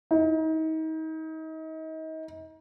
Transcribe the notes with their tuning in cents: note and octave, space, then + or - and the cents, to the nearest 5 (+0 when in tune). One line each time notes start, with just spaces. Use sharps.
D#4 +35